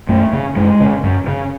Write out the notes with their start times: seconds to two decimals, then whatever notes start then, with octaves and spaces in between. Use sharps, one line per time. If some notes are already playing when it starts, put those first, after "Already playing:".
0.09 F#2 A3
0.33 C#3
0.56 F#2 G#3
0.80 C#3
1.04 F#2
1.27 C#3